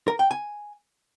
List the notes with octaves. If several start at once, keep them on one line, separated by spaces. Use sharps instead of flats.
A#4
G5
G#5